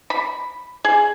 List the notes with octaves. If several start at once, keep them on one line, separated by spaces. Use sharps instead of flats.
B5
G#4